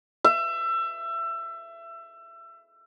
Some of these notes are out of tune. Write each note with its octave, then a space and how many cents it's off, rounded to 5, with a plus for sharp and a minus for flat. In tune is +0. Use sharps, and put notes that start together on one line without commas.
E5 +25